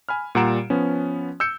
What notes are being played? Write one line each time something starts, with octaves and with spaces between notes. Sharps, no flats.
G#5 B5 F6
A#2 G3 F#5 A#5 D7 E7
F3 B3 C#4
E6 G6 C#7